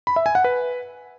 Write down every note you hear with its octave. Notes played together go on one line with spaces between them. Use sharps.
B5
E5
G#5
F#5
B4